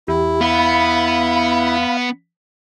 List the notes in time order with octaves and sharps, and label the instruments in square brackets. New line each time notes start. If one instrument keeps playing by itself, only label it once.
[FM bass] E2 [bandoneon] E4 [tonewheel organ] G4
[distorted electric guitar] B3 [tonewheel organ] F5 B5